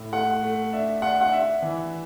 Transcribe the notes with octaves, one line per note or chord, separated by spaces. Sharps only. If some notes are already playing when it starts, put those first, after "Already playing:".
Already playing: A2
A3 F#5
A3
D4 E5
D4 F#5
F#5
D4 E5
E3